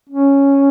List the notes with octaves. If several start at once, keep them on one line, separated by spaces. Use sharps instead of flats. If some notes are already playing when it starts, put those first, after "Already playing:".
C#4